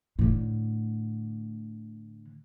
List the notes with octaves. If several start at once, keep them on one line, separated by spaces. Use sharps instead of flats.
A2 D3